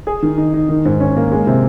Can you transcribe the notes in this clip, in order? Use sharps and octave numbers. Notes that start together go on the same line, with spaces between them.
G#4
D#3
D#4
D#4
D#3
G#2
C#4
A#3
G#3
C3